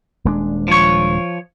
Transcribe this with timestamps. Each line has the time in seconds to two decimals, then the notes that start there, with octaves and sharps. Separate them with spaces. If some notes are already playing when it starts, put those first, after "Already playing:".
0.25 D#1 G#3 D4
0.68 F3 C#5